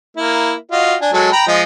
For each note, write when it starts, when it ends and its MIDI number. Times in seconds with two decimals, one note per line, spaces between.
0.17 0.53 58
0.17 0.53 64
0.71 0.95 65
0.71 0.95 66
0.71 0.95 75
1.01 1.11 62
1.01 1.11 80
1.13 1.29 54
1.13 1.29 56
1.13 1.29 69
1.32 1.47 79
1.32 1.47 82
1.32 1.47 83
1.47 1.63 53
1.47 1.63 56
1.47 1.63 75